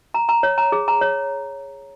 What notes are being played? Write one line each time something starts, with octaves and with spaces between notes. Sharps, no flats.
A#5
A#5
C#5
A#5
G#4
A#5
C#5